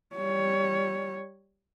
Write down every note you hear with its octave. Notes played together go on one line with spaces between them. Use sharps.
G3 C#5